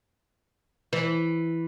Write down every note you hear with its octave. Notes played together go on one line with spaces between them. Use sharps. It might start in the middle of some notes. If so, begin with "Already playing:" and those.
E3